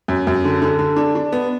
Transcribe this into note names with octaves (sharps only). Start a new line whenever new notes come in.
F#2
F#2
D3
D3
D3
D4
D4
B3